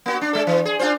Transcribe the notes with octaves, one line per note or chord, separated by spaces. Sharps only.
A#3 F#4
D4
G#3 A4
E3
G#4
D4 F4 C5